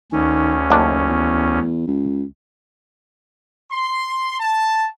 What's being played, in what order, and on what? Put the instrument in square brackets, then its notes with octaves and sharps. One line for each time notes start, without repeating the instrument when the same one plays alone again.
[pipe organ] D2 C#4 [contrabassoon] D#3
[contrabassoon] F#1 [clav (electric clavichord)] D#2 D4
[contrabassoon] E2
C#2
[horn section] C6
A5